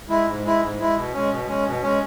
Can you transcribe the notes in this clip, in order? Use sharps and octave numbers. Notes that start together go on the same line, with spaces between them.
G#3 E4
G#2
G#3 E4
G#2
G#3 E4
B2
G#3 C#4
B2
G#3 C#4
B2
G#3 C#4